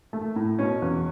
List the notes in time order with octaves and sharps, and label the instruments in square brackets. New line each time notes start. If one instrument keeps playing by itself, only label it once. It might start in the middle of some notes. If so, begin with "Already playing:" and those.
[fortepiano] A3
A2
B2 C#4
E2